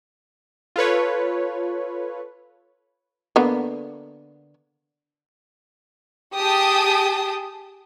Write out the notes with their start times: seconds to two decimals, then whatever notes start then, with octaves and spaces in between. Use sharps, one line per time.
0.76 F4 A4 B4 C#5
3.36 D3 A#3 B3
6.37 G4 G#4 G5 A5 D#6